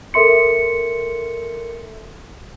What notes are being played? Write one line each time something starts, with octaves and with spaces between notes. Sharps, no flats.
A4 A#4 E5 C6 C#7